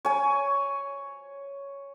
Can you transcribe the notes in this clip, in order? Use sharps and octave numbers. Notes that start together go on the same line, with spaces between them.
C#5 G#5